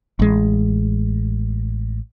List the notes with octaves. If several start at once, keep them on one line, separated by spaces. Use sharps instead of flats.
A1 G#3